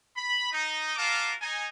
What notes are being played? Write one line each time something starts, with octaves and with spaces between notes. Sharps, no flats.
B5
D#4
F4 F#4 A#4 F5 A5 D6
D#4 G#5